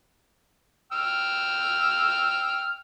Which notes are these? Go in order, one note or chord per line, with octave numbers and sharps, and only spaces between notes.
G5 E6 F6